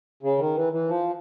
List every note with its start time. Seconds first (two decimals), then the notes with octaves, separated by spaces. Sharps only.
0.23 C#3
0.38 D#3
0.56 E3
0.73 E3
0.88 F3